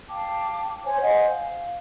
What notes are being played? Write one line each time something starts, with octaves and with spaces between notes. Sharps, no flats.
F5 G5 A5 D6
C5 C#5 G#5
C5 D#5 F#5 G#5
F5